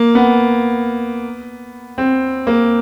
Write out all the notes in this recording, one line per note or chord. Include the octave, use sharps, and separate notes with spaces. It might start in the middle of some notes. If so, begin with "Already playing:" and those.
Already playing: A#3
B3
C4
A#3